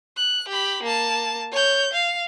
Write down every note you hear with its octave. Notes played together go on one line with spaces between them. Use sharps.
F#6
G4 B5
A#3 A5
C#5 G6
F5